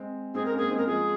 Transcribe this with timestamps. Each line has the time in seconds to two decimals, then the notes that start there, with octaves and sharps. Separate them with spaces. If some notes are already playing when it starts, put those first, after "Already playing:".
Already playing: G#3 C4
0.34 G#3 C4 G#4
0.46 A#4
0.52 A#3 C#4
0.58 G#4
0.70 G#3 C4
0.77 A#4
0.87 F3 G#3 G#4